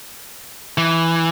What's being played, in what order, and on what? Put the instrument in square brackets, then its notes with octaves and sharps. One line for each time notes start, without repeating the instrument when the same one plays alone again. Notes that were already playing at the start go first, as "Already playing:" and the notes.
[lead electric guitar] E3